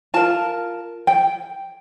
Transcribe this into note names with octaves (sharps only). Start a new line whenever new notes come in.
F4 A#4 A5
G5